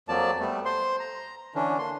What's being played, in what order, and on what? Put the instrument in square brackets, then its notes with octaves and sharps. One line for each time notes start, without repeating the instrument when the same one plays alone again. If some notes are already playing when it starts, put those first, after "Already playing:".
[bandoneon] F2 F3 F#3 A#3 D5 A5
G3 A3 B3
C5 C6
A#5
D3 E3 C#4 D4
A#3 C6